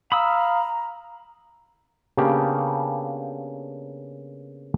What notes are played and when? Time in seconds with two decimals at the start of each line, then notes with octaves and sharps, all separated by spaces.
0.12 F5 A#5 B5 D#6 E6
2.17 C#3 A#3 B3 D4 G4